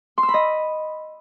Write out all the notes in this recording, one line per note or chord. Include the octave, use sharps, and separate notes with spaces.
C6
E6
B5
D#5